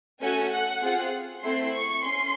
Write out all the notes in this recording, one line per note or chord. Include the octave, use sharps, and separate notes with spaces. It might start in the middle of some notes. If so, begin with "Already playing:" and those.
A3 C#4 F#4 A4 G#5
F#5
C4 F4 G#4
A3 C4 E4 A4 C6
C#6
C#4 C6